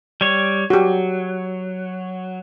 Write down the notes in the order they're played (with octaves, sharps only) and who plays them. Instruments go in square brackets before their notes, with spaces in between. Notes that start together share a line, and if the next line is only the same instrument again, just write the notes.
[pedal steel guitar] G3 C#5
[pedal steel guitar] F#3 [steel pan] F#4 G4